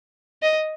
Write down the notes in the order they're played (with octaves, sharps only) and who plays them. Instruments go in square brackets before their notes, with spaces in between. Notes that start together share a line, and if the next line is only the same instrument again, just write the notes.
[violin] D#5